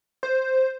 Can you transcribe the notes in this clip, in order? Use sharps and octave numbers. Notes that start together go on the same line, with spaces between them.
C5